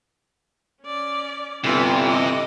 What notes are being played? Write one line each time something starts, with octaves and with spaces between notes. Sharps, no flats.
C#4 D5
G1 C3 E3 F4
D#5 D6